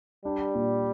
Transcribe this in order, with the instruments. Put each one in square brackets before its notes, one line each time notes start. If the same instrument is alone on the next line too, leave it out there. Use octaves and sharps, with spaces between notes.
[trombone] G3 [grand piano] D4
[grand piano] A#2